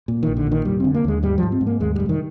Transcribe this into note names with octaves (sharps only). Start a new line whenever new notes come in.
A#2
A#1 D#3
D3
A#2 D#3
F1 G3
D3 C4
A#3
D#2 G#3
G#2 G3
F3
G#2
C4
G#2
A#3
D#2 G#3
F1 G3
D#3